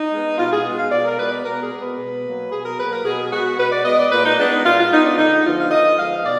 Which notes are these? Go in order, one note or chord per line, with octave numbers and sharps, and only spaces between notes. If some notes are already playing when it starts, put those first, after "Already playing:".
Already playing: D#4
G#3 B3
B2 F4
G#4
G#3 B3
F5
B2 D5
A#4
G#3 B3 B4
D5
B2 A#4
G#4
G#3 B3
B4
B2
F#3 A#3
B2 G#4
A#4
F#3 A#3 B4
A#4
B2 G#4
G#4
G#3 B3 F#4
B2 B4
D5
G#3 B3 D#5
D5
A#2 B4
D#4
G#3 B3 D4
D#4
A#2 F4
F4
G#3 B3 D#4
D4
D3 D#4
F3 G#3 B3 F4
F5
D3 D#5
F3 G#3 B3 F5
B2 D5